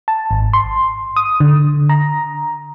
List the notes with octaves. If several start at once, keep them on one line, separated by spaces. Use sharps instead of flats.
A5
G#1
C6
D#6
D3
A#5